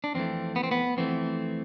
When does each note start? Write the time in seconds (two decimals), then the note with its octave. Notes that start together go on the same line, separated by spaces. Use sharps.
0.04 D4
0.15 F2 E3 A3 C4
0.56 B3
0.63 C4
0.71 B3
0.97 F2 E3 A3 C4